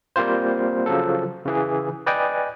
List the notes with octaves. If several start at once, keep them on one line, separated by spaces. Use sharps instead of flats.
G3 A#3 C4 F4 C5
C#3 F3 F#3 A4
C#3 E3 G#4
B4 D5 D#5 G5 G#5